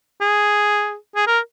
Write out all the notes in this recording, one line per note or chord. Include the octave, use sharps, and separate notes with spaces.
G#4
G#4
A#4